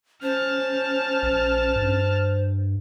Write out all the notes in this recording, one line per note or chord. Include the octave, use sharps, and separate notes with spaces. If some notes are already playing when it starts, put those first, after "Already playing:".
C#4 C5 A5 F6
A#1
G2